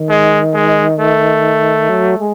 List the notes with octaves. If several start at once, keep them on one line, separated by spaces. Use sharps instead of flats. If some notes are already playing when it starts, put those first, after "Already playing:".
Already playing: D#3
G#3
G#3
A3
F#3
G#3